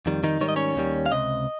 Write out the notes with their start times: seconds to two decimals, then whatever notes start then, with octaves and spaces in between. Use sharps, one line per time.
0.06 F2 D#3 G3
0.24 D#3 D#4
0.41 G#2 D#3 G3 C#5
0.49 D#5
0.56 C#4 C#5
0.76 D#2 D#3 G3
1.06 F5
1.11 C#2 C3 D#5